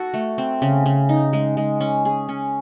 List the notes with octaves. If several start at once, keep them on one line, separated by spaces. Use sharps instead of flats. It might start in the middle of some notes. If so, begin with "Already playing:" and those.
Already playing: F#4 A4
A3
C4
C#3
C#3
D#4
G#3
G#3
C#4
G#4
C#4